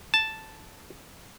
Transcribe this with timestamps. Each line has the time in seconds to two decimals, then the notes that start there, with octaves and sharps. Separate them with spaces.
0.14 A5